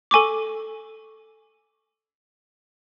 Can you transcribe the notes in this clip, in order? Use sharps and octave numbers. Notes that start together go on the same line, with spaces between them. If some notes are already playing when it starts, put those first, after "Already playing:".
A4 G#5 C#6 D6